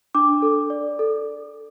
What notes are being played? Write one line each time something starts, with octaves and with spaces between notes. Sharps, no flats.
D4 D6
A4
D5
A4